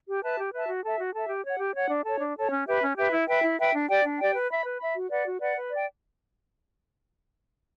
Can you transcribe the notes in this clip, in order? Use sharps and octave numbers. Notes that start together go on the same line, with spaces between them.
G4
B4 E5 A5
G4
B4 E5 A5
F#4
A4 E5
F#4
A4 E5
G4
C#5 F#5
G4
C#5 F#5
D4
A4 C#5
D4
A4 C#5
C#4
G4 B4 E5
C#4
G4 B4 E5
E4
B4 E5 G5
E4
B4 E5 G5
D4
G4 D5 G5
D4
G4 D5 G5
B4
E5 B5
B4
E5 B5
F#4
B4 D5 F#5
F#4
B4 D5 F#5
B4
D5 G5